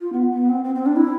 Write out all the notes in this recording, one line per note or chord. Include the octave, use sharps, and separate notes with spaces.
F4
B3
B3
C4
C4
C4
D4
E4